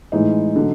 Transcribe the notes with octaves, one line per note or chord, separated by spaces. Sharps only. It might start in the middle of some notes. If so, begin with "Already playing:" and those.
A2 E3 G#3 D#4
D3 F#3